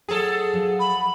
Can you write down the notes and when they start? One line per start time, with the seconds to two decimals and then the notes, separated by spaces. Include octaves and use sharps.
0.09 F#3 G#4 A4 G#5
0.53 F3 F#3
0.80 B5